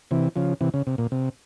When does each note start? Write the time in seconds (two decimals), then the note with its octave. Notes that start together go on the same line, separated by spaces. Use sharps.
0.11 C3 E3
0.36 C#3 F3
0.61 C3 E3
0.74 C#3
0.87 C3
0.98 A#2
1.12 C3